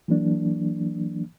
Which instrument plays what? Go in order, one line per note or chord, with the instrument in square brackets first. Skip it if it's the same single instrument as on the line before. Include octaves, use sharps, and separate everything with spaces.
[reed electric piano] E3 F#3 A#3 D4